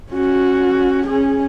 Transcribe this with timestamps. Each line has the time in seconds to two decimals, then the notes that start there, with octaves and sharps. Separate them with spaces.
0.12 C#4 F#4
1.07 C#4 G#4